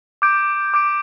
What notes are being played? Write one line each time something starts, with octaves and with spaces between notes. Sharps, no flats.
D6 G6 D7
D6 G6 D7